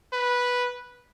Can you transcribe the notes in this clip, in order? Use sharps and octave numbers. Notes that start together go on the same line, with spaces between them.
B4